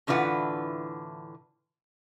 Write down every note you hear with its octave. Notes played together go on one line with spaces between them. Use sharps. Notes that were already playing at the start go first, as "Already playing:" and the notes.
A2 D3 E3 F4 B4 F#5